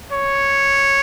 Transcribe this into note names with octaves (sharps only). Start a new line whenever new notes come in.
C#5